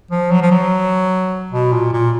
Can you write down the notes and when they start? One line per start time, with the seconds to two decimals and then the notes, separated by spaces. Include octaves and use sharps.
0.11 F3
0.31 F#3
0.42 F3
0.51 F#3
1.52 B2
1.73 A#2
1.93 A#2